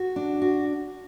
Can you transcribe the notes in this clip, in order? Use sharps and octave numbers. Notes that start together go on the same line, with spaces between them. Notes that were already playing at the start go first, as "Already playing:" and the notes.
Already playing: F#4
D4
F#4